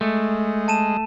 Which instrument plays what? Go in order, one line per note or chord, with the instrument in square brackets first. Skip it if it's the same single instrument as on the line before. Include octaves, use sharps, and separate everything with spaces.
[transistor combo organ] G#3 [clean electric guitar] A3
[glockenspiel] A5 D#7 E7